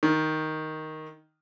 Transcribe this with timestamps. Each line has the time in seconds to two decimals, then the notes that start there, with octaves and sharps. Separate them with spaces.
0.03 D#3